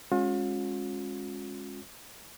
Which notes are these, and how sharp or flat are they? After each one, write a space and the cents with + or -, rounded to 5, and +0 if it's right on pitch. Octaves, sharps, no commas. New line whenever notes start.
G#3 -10 C#4 -20 F4 +45